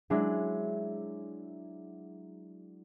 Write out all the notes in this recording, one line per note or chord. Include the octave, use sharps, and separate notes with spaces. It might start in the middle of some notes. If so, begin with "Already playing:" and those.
F#3 G#3 D4 E4